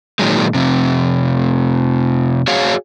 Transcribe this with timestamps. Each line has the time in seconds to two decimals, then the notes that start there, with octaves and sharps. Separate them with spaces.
0.19 A#2 D#3 F#3 G#3
0.54 F2 C3
2.47 F#4 G#4 C#5 F5